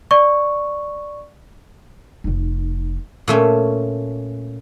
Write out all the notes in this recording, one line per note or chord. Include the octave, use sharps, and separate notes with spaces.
D5 C#6
F1 D#4
A#2 A3 C#4